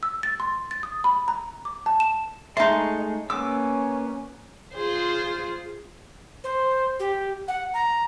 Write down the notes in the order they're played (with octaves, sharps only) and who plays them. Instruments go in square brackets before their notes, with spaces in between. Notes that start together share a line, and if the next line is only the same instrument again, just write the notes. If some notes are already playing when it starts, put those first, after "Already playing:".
[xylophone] E6
A6
C6
A6
D#6
B5
A#5
D6
A5
E7
[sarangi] G#3 [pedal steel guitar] A3 C6 [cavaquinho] D#4 A5 [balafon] E5
[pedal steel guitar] A#3 B3 E6 [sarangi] C#4 [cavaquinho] D6
[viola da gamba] F4 G#4 C5
[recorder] C5
G4
F#5
A#5